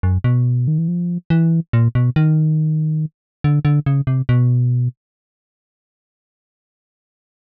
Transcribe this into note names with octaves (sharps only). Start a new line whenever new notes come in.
F#2
B2
D#3
E3
F3
E3
A#2
B2
D#3
D3
D3
C#3
C3
B2